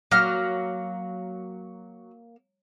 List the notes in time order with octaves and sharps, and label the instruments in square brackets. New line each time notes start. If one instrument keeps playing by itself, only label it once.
[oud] F#3 [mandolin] A#3 F6